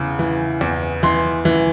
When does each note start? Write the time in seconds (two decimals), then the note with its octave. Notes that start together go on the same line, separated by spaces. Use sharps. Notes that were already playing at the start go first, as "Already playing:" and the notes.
Already playing: E2 C#3
0.19 E3
0.61 E2
1.03 E3 C6
1.45 E3